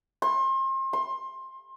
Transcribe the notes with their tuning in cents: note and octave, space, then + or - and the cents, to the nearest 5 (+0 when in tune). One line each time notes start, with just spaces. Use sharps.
C6 +35
C6 +20